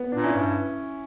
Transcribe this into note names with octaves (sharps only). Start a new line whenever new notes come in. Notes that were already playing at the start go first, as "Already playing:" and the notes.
Already playing: B3
A#2 D4
C#4 E4
G2